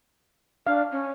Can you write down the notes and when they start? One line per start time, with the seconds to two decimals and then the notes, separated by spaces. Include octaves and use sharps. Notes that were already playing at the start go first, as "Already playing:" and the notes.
0.67 D4 F5
0.92 C#4